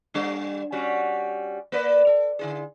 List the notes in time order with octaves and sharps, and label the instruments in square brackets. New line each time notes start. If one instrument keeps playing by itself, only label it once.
[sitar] G3 D4
G3 C#4 F#4
A#3 B4 D5
A4
D3 E4 G#4